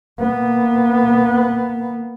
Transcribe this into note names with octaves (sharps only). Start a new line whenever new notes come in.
A#3 B3